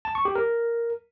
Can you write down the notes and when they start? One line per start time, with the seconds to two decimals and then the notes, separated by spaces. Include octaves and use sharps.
0.05 A5
0.15 C#6
0.25 G4
0.35 A#4